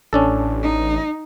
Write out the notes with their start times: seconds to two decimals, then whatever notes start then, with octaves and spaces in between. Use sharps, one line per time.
0.13 A1 C#4 D4 A4
0.63 D#4